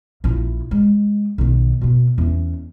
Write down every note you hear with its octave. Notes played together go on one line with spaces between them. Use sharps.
A#1 E4
G#3
B1 D#3
B2 B3
E2 C#4